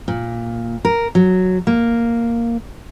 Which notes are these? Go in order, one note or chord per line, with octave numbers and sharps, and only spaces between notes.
A#2
A#4
F#3
A#3